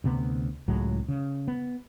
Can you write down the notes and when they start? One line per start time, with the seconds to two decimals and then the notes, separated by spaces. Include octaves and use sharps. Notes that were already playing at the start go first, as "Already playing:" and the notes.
0.04 D2 C3 B3
0.68 C#2 A2 F#3 G#3
1.08 C#3
1.48 B3